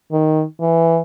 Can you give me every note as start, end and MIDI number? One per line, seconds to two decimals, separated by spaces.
0.12 0.44 51
0.61 1.00 52